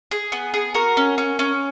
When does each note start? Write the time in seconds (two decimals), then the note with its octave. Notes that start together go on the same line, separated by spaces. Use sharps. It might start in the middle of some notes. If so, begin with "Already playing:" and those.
0.11 G#4
0.32 B3
0.54 G#4
0.74 F#4 A#4
0.97 C#4
1.18 C#4
1.39 C#4